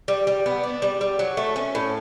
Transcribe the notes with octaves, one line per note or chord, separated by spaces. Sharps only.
G3
G3
B3
D4
G3
G3
F#3
A3
C#4
A2